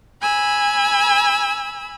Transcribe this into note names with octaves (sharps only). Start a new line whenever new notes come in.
G#5 B5 E6